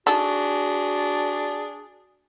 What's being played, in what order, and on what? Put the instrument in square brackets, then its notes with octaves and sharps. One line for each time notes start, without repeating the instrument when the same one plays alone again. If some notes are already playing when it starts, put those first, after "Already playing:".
[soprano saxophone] D4 [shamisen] D#4 A4 [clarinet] F#4 [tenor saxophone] G#4